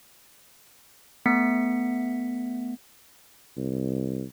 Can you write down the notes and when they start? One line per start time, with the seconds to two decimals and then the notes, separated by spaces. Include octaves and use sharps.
1.26 A3 B3 B6 C#7
3.57 C2